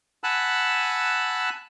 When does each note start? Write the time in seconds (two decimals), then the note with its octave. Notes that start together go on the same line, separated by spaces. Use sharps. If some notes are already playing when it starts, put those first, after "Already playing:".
0.24 F#5 G#5 A5 B5 E6 F#6